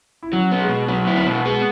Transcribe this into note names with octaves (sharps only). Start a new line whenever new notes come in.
E4
F#3 C#4
B3
G#3
B2
F#3 B3
E4
B3
B2
G#3 B3